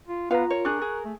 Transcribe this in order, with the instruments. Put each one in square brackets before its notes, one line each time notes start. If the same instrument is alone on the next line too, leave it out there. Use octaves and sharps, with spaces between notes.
[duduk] F4
[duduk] B3 [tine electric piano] F4 A#5 [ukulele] B4 F5
[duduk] A#4 [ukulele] C#5
[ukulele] D4 G#4 [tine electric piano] C#6 F#6
[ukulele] G#4
[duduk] A3